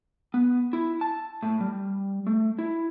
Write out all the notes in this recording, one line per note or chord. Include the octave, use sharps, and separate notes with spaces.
B3
E4
A5
A2
G3
A3
E4